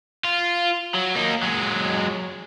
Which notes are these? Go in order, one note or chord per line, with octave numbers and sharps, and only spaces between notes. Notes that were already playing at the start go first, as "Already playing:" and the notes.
F4
F#3
A#3 D#4
F#3 G#3